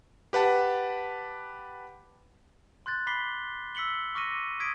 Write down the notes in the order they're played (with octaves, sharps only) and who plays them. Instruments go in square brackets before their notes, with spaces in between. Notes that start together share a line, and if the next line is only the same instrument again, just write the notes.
[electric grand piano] G4 B4 F#5 A5
[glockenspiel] C6 F#6 G6 A6
B5 D6 B6 C7 G7
E6 B6 C#7 F#7 G7
C#6 D6 F6 A#6 C#7 D#7
D#6 G#6 B6 D7